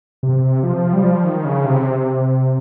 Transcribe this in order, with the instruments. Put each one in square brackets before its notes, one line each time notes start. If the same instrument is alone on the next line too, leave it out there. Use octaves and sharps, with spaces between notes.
[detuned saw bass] C3
F3
G3
F3
D#3
C#3
C3